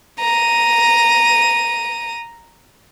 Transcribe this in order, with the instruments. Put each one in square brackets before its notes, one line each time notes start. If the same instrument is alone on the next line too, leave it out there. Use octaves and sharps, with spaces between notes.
[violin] A#5 D#7